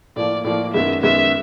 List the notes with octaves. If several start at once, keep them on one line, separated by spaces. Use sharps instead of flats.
A2 F3 A#3 D5
A2 F3 A#3 D5
F#2 D#3 G#3 B3 E5
F#2 D#3 G#3 B3 E5